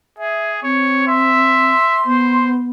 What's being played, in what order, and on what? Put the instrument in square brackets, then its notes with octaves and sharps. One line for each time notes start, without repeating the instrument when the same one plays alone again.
[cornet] G#4 [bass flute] E5
[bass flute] C4 [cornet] C#5
[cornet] E5 [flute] C6
[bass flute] B3 [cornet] C5